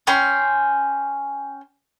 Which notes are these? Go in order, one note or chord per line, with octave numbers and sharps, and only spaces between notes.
C#4 G5 C6